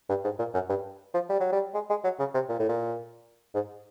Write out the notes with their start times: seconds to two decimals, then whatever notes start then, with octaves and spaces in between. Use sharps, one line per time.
0.09 G2
0.24 G#2
0.39 A#2
0.54 F#2
0.70 G2
1.14 F3
1.29 G3
1.40 F#3
1.52 G3
1.74 G#3
1.90 G#3
2.04 F#3
2.19 C#3
2.34 C3
2.49 A#2
2.59 A2
2.69 A#2
3.55 G#2